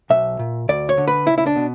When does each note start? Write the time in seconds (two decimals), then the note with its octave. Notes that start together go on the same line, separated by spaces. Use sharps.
0.10 B1 E5
0.39 A#2
0.69 D2 D5
0.89 C#5
0.98 D3
1.08 B4
1.27 C#2 E4
1.38 E4
1.46 D4
1.56 B2